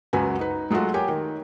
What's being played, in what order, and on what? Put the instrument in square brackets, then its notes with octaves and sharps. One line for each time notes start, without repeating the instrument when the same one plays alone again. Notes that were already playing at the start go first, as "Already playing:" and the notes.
[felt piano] C#2 F#2 F#4 B4 G#5
D#4 B4
F#3 G#3 A3 F4 F#4
G4 A#4 C#5 G5 G#5
D#3